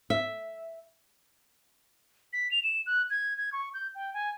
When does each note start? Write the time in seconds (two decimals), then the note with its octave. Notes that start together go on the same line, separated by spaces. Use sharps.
0.10 E5
2.33 B6
2.51 F7
2.63 E7
2.86 F#6
3.10 G#6
3.38 G#6
3.53 C#6
3.74 G6
3.95 G5
4.14 G#5